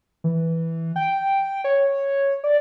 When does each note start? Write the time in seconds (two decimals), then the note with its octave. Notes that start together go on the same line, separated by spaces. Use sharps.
0.24 E3
0.96 G5
1.64 C#5
2.44 D5